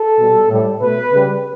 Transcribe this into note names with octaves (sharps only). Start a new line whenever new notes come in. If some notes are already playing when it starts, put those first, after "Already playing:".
Already playing: A4
B2 G3
A2 G3
B2 A3 B4
C#3 G3